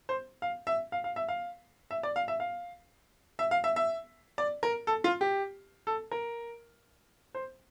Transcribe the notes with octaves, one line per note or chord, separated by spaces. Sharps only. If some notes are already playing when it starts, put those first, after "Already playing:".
C5
F5
E5
F5
F5
E5
F5
E5
D5
F5
E5
F5
E5
F5
E5
E5
D5
A#4
A4
F4
G4
A4
A#4
C5